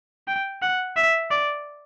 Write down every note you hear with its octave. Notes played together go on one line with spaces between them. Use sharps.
G5
F#5
E5
D5